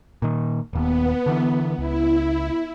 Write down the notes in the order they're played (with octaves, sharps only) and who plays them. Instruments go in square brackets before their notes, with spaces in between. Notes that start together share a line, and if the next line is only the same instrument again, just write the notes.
[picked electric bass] A#2 D#3
[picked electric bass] D#1 D#2 [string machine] B3
[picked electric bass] D3 E3
[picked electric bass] C#2 [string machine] E4